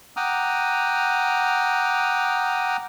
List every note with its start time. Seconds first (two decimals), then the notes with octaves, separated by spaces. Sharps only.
0.17 F#5 G5 A#5 D6 D#6 F6